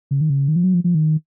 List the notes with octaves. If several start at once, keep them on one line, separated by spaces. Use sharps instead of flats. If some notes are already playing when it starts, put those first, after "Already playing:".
C#3
D#3
C#3
D#3
F3
F#3
F3
F3
D#3